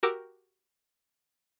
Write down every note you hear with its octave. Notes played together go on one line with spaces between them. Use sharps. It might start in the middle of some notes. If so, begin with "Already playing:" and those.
F#4 G4 A#4 D6 E6